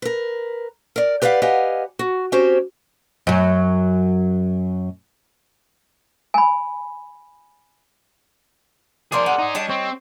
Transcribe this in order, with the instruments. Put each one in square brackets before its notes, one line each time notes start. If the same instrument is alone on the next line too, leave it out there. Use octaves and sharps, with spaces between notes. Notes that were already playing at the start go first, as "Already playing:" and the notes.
[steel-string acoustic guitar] A#4 B4
A#4 D5
G4 B4 D5 D#5 F5 F#5
G4 B4 D#5 F5 F#5 G#5
F#4
C4 C#4 F#4 G4 C5 C#5
[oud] F#2 F#3
[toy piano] G#5 B5
[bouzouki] F3 A#3 D4 [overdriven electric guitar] G#4 A#4 [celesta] D5 C6 D6
[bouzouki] F#5
[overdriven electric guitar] D#4 G#4
[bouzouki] G3 C#5 D#5 [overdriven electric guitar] D4
[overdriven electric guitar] C4 [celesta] C#6